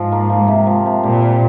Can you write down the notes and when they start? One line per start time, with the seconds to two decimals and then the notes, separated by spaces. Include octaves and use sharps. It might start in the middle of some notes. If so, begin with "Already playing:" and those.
Already playing: G#2 F3
0.12 A#3
0.30 F3
0.48 C3
0.67 F3
0.86 C3
1.03 A#2 G3
1.22 C4